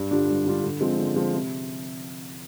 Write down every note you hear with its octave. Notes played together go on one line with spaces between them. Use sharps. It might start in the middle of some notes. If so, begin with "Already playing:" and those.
Already playing: G2
D3 G3 D4 F4
G2
D3 G3 D4 F4
D3
F3 G#3 C4
D3
F3 G#3 C4
C3